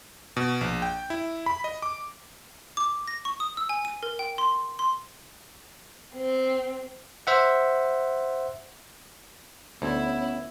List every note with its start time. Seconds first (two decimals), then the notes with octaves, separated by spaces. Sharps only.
0.37 B2
0.61 A#1
0.82 G5
1.10 E4
1.46 B5
1.64 D#5
1.82 D6
2.77 D6
3.08 A#6
3.25 C#6
3.40 D#6
3.57 E6
3.69 G#5
3.85 D#7
4.03 A#4
4.19 G5
4.38 C6
4.79 C6
6.15 C4
7.27 C5 E5 F#5
9.82 D2 B3 C#4 E4